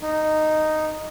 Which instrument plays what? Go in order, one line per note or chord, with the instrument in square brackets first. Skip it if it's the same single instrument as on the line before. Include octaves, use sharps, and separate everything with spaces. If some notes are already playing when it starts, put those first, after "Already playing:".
[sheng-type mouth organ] D#4